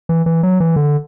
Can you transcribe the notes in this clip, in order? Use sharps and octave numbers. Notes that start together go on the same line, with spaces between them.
E3
E3
F#3
E3
D3